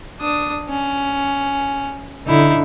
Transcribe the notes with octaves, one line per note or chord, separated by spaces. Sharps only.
D4 D#6
C#4
D3 D#4 E4